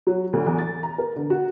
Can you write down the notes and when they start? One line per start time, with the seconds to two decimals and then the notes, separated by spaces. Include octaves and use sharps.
0.07 F#3
0.33 D2
0.46 E2
0.59 A6
0.83 A#5
0.98 A#4
1.16 D3
1.30 F#4